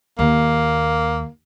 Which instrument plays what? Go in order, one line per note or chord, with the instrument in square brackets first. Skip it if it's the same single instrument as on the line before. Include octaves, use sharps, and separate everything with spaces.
[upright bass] D#2 [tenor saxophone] A#3